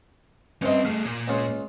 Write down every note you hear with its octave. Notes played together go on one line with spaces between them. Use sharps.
G2 C3 C#4 D#5 C6
A3 G#4 F5
A#2
C#2 C#3 F4